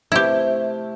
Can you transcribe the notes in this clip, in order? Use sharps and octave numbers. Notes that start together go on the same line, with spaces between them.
C3 A3 E4 G4